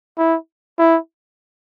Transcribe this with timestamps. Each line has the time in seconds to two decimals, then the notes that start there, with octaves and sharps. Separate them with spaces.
0.18 E4
0.79 E4